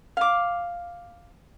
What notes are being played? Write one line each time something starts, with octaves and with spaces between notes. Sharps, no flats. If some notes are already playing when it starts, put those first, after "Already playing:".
F5 D6